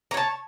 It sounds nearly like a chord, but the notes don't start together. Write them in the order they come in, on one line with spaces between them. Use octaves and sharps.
A#5 C#5 A5